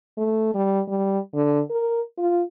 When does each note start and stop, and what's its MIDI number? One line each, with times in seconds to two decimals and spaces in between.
0.17 0.53 57
0.54 0.81 55
0.88 1.19 55
1.34 1.60 50
1.70 2.01 70
2.18 2.41 65